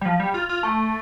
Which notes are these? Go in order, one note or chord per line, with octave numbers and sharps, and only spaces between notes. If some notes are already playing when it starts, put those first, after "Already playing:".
G3
F3
G3
F4
F4
A3